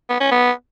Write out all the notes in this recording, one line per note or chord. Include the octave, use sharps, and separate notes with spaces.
B3
C#4
B3